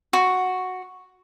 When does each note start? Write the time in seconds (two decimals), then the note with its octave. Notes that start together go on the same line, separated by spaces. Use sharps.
0.13 F#4